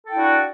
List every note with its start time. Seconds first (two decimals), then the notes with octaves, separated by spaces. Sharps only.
0.06 A4
0.09 G5
0.13 E4
0.16 D4
0.19 F#4